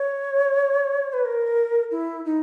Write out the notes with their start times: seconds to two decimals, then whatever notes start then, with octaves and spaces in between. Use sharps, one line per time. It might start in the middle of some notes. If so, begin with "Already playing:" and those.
Already playing: C#5
1.13 B4
1.25 A#4
1.91 E4
2.25 D#4